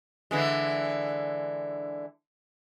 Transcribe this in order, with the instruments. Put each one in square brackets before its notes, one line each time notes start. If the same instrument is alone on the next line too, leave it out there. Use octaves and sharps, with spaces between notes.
[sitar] D3 E3 G#3